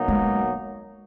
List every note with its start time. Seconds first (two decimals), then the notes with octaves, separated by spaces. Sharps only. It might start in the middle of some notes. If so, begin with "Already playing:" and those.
Already playing: B2 F#3 A#3 D#4
0.08 G#3